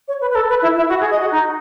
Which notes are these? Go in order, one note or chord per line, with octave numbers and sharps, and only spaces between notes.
C#5
B4
B4
A4
B4
E4
E4
F#4
G#4
D#5
F#4
D#4